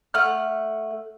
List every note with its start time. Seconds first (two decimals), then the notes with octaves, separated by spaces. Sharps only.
0.14 A3 F#5 F6